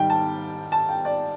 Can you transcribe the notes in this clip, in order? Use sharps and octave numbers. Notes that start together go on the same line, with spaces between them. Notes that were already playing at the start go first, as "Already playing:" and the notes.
Already playing: G#2 D#3 G3 G5
A5
A5
G5
D5